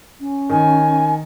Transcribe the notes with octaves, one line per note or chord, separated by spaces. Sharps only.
C#4
D#3 G#5